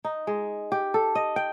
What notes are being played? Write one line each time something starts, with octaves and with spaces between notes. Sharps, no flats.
D#4
G#3
G4
A4
D#5
G5